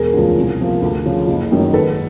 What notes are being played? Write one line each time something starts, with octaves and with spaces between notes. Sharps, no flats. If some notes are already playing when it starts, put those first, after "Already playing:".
Already playing: E1 G#4 A#4
D2 C#3 F3
C2
C3 F3 A#3
D2
C#3 F3
F#1
F#2 D#3 F#3
G#1 A4 B4